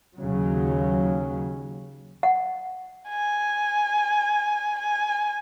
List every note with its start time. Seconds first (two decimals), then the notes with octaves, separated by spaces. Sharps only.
0.18 D#2 C#3 F#3
2.23 F#5
3.09 G#5
4.79 G#5